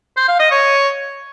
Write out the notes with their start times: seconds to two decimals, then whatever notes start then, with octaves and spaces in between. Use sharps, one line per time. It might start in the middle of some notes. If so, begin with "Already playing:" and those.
0.17 C5
0.28 F5
0.40 D#5
0.51 C#5